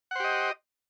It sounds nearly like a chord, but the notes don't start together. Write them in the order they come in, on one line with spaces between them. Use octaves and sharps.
F#5 C5 G4 D#5